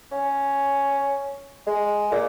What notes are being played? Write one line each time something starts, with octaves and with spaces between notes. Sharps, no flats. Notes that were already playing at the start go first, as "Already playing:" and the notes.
C#4
G#3
A#2